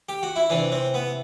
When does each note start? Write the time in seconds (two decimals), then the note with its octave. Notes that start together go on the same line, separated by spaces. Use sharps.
0.09 G4
0.23 F#4
0.36 E4
0.50 C3 E3 D4
0.72 C4
0.94 B3